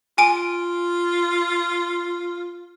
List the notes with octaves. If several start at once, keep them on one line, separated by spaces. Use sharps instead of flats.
F4 G#5 D7